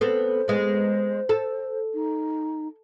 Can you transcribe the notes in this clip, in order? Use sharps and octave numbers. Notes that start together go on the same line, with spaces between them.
B3 C4 A4 C5
G#3 B3
A4
D#4